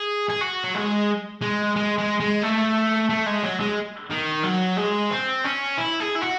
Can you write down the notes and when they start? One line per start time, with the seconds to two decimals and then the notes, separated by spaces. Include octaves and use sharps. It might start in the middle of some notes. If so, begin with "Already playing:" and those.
Already playing: G#4
0.29 G#4
0.41 F#4
0.64 F#3
0.75 G#3
1.41 G#3
1.76 G#3
1.98 G#3
2.20 G#3
2.43 A3
3.10 A3
3.26 G#3
3.43 F#3
3.60 G#3
4.11 D#3
4.44 F#3
4.77 G#3
5.11 C4
5.45 C#4
5.78 E4
6.01 G#4
6.16 E4
6.22 F#4